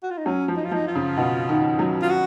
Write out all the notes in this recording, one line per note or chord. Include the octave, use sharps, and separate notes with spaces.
F#4
F4
D#4
F#3 C#4
F3
D#4
F4
F3 D#4
F4
C#3
B2
D#3
F#3
F4
F#4